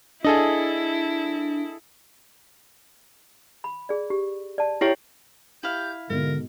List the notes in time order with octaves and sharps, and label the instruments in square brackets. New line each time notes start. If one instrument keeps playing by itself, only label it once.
[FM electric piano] D4 [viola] E4 [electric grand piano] G#4 A4 D#5
[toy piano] B5
G#4 D5
G4
D5 A5
[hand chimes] E4 G4 C#5
[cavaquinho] E4 F5 [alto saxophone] G4 [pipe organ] G6
[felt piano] G#2 B2 [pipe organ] D3 [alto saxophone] A#4